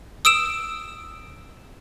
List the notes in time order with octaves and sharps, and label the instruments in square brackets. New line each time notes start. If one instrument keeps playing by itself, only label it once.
[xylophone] D#6 E6 D7 E7